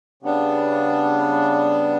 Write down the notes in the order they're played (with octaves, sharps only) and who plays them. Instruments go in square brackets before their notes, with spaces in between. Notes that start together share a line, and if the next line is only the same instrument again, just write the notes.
[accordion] C#3 G3 B3 D4